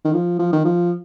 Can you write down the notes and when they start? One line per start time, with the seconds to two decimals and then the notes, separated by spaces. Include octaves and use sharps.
0.05 D#3
0.13 F3
0.39 F3
0.53 D#3
0.65 F3